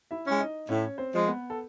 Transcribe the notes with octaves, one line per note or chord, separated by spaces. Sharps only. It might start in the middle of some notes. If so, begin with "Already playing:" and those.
E4 E5
G#3 C#4
D#4 D#5
A2 C#4 C#5
C4 C5
F3 G#3
B3 B4
A4